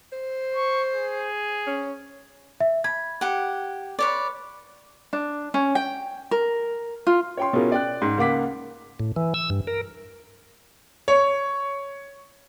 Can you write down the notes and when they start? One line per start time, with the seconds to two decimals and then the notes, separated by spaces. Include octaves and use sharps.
0.13 C5
0.55 C#6
0.93 G#4
1.67 C#4
2.61 E5
2.84 B5 G#6
3.21 G4 F#5
3.99 B4 C#5 D5
5.13 D4
5.54 C#4
5.75 G5
6.31 A#4
7.07 F4
7.37 C#5 G5 C6
7.53 B2 C#4 E4 F4 G#4 A#4
7.72 D5 G5 F#6
8.02 G#2 C6
8.17 C#2 A#3 F#5 D6 B6
9.00 A2
9.16 E3
9.34 E6
9.50 G2
9.67 A#4
11.08 C#5